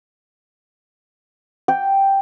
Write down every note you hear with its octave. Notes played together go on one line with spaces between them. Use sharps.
G5